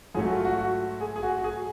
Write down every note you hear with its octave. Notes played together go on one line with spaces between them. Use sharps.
G#2 F#3 A3 G#4
F#4
F4
F#4
F#4
G#4
G#4
F#4
F#4
G#4